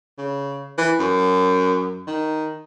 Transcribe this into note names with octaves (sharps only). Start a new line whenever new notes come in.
C#3
E3
F#2
D#3